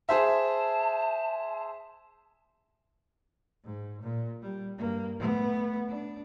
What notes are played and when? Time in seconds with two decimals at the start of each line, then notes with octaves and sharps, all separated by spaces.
0.09 G#4 C5 E5 A5
3.64 G#2
4.02 A#2
4.42 G3
4.78 G2 A#3
5.19 A3 B3
5.88 D4